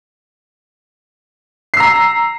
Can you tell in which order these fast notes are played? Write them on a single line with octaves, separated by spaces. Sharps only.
C7 E6 A#5